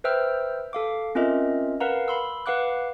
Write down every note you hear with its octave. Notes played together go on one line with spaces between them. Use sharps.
B4 C5 E5 G5 E6 F6
A4 F5 D6
C4 C#4 F4 A#4 D#5 E5
A#4 B4 F5 F#5 A#5
B5 C6 E6
B4 F5 F#5 D6 F#6